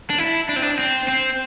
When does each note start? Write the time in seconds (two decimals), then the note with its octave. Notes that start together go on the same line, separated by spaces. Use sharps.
0.10 D4
0.18 E4
0.49 D4
0.56 C4
0.62 D4
0.79 C4
1.08 C4